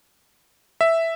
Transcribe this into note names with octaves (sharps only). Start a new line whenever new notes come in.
E5